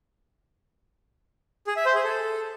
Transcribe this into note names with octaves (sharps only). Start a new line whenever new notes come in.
G#4
E5
C5
G#4
A4